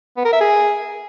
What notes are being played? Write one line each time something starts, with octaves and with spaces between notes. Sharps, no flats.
B3
A#4
E5
G#4